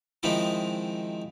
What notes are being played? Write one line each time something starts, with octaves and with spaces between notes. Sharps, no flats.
D#3 F3 G#3 C4 D#4 E4